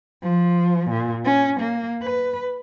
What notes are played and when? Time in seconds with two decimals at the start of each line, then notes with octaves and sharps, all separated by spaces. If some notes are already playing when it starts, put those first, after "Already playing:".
0.23 F3
0.90 A#2
1.25 C#4
1.60 A#3
2.03 B4